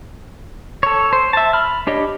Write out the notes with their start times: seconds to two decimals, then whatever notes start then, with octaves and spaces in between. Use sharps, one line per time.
0.83 A4 C#5
1.13 C5
1.33 E5 A5
1.53 B5 F6
1.87 D4 G4 C#5 D#5